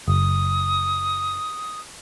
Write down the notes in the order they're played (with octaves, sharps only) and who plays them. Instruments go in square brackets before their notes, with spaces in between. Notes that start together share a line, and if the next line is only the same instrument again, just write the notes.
[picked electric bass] F#1 [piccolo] D#6